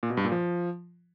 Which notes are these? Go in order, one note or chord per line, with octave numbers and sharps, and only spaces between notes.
A#2
B2
G2
A#2
F3